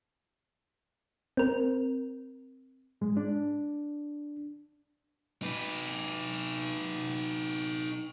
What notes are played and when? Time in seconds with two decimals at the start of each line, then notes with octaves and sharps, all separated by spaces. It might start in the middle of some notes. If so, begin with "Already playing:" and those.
1.37 C4 A#4
3.01 G#2 G#3
3.17 D4
5.42 D#4 B4